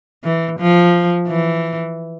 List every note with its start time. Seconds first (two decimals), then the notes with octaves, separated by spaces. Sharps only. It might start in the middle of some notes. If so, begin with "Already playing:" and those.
0.24 E3
0.59 F3
1.28 E3